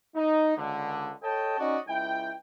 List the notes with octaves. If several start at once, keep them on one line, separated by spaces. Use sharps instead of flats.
D#4
C#2 D3
A4 C#5 D#5 G5 A5
C#4 D#4 F#4 D5 D#5
C#2 E4 G5